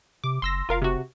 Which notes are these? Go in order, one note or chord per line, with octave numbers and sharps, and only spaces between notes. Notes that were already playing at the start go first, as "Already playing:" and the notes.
C3 D6
F#1 C6 E6 A#6
F1 F4 A#4 F5
C3 F#4